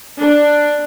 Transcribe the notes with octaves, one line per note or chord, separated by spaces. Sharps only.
D4